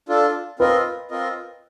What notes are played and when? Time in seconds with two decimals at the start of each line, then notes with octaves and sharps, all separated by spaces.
0.09 D4 F4 A4
0.59 C4 F4 A#4 B4 D#5
1.10 C4 F4 A#4 D#5